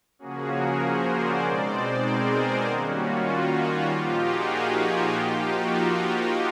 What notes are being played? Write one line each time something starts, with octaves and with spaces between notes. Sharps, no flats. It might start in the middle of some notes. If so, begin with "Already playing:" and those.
C#3 F3 A#3 C#4 F#4 G#4
G#4 A#4
A#4 C5
C5 D5
B2 G#3 C4 D#4 C5 D5
G#4 A#4
A#4 C5
D#3 G3 A#3 C#4 F#4
F4
F#4
F#4
A#2 F3 A#3 D#4 F4 G4
F#4 G#4
F3 A#3 D#4 F4 G4
F#4
F4